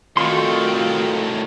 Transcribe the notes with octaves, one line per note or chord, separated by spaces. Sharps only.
A2 D#3 C4 F4 F#4 A4 C6 C#6